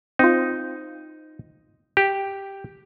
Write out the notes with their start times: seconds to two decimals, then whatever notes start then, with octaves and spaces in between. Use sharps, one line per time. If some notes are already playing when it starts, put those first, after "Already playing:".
0.19 C4 D#4 F4
1.97 G4